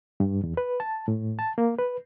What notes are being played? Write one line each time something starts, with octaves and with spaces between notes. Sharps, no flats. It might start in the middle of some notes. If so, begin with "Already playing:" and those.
G2
E2
B4
A5
A2
A5
A#3
B4